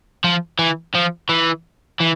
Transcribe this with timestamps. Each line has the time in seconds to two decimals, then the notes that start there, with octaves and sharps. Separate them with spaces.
0.24 F3
0.59 E3
0.94 F3
1.29 E3
2.00 E3